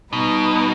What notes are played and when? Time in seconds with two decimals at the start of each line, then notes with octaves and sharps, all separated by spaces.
0.12 B2 G3 B3 D#4 B4